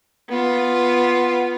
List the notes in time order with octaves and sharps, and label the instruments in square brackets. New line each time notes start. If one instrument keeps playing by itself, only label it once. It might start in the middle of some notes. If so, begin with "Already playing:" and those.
[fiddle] B3 F4